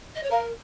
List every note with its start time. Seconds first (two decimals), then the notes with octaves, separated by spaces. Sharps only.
0.15 D#5
0.23 C#5
0.30 A#4 F5 A#5